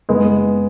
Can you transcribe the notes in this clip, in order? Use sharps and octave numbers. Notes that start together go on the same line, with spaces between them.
F#1 G#3 B3